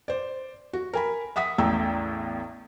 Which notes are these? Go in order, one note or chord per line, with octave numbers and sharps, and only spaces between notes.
C5 D5
F#4
A#4 G#5 B5
E5 F#5 D#6 B6
A1 E2 A2 G5 A#5 E6